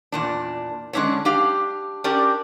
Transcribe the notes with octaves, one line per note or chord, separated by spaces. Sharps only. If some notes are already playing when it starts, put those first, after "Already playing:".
E2 A#2 D4
D3 G#3 C#4 D4 E4 C#5
D4 G4 F5
C#4 D4 G4 A#4 D5